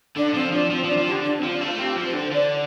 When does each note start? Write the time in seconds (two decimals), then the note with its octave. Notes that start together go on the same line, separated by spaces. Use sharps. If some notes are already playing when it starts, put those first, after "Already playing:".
0.16 D3 D4
0.34 F3 C4
0.53 F3 D4
0.71 F3 C4
0.84 F3 D4
0.98 F3
1.07 D3 G4
1.24 D4
1.38 C4
1.43 F3
1.52 D4
1.61 A3 F4
1.78 C4 G4
1.96 F3
2.05 C5
2.14 D3
2.32 D3 D5